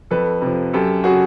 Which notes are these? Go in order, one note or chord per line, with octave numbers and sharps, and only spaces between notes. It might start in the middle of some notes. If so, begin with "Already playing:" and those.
F2 A4 B4
C3 F3
F#2 G4 A4
C#3 F#3 F#4 G#4